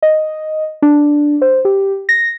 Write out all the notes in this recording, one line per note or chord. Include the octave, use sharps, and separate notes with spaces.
D#5
D4
C5
G4
A#6